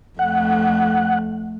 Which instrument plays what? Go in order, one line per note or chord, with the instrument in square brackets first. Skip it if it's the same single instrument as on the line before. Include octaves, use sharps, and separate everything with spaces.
[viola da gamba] F2 A3 [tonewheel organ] F#5